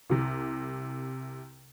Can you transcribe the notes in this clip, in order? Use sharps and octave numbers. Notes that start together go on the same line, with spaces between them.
C2 C3